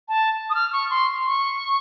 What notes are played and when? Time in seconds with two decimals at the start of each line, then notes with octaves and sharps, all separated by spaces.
0.08 A5
0.50 D#6
0.55 F6
0.73 C#6
0.90 C6
1.26 C#6